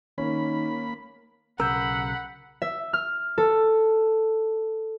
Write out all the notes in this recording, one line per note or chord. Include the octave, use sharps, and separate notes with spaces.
D#3 A#3 C#4 B5
B1 C#3 A#4 F#5 B5 E6 G6
E5
F6
A4